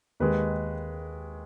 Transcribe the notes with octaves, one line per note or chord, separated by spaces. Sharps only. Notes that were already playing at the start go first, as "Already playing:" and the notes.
D#2 D#3 G#3 B4